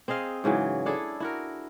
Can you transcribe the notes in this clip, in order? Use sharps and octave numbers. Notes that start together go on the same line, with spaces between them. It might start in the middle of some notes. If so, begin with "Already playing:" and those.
C4 G#4 D#5 F5
G#2 C#3 E3 F#3
D4 E4 G#4 A4
E4 F#4 A#4